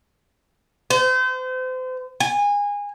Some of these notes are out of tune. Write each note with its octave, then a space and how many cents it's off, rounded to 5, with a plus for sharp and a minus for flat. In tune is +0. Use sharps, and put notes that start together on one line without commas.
C5 -35
G#5 -25